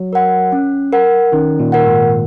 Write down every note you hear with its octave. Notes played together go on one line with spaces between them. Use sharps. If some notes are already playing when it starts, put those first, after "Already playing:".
Already playing: F#3
A#4 F#5
C#4
A#4 F#5
D#3 C#4
A#2
A#4 F#5
G#2